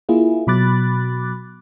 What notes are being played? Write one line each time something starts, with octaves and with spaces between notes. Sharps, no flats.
A#3 E4 F4 G#4
B2 F#3 B5 D6 F#6 A6